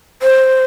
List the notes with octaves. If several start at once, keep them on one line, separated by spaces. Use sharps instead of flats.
C5